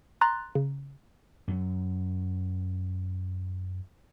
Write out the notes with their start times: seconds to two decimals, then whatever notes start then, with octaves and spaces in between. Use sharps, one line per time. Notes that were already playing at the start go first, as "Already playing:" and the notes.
0.21 A#5 C6 F#6 A6
0.55 C#3
1.48 F#2 F#3